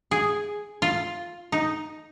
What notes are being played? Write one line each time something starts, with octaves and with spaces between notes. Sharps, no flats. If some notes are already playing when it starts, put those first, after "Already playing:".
G#4
F4
D#4